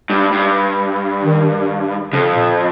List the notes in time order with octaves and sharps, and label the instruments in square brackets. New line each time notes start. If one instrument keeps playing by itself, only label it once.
[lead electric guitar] G2
G2
[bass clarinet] D#3
[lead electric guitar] F2 [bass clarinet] C#3
[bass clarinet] A#2